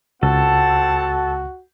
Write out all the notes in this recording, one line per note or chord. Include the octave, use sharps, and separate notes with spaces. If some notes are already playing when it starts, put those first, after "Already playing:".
C#2 C4 F#4 A4 F#5 A5